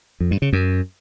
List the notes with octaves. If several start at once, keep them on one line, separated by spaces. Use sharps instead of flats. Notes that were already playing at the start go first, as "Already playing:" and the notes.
F2
G2
C#3
F#2